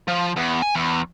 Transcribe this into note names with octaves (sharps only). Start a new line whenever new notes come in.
F3
E2
G#5
E2